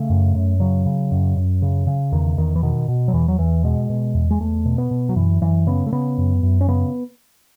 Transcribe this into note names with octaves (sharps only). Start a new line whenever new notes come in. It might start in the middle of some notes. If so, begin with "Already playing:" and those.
Already playing: C#3 A3
F#2
F#2
C#3 F#3
C#3
F#2
F#2
C#3
C#3
E2 D#3
E2 D#3
E3
B2 D#3
B2
F#3
E2 E3
F#3
E2 E3
B2 G#3
B2
E2
G#3
E2 A3
B2
B3
B2
F#3
F#2 E3
F#2 E3
C#3 B3
A3
C#3 B3
F#2
F#2
C#4
C#3 B3